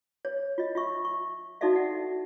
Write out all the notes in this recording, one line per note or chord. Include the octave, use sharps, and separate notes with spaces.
C#5
F4 D#5
F4 E5 C#6
C#6
D#4 F#4 A4 D5 E5 F5
F#5